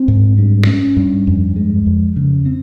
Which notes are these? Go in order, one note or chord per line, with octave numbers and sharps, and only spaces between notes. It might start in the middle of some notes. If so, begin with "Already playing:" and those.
Already playing: C4
G#2
G2
C#4
G2
F2
G#3
F2
C#3
C4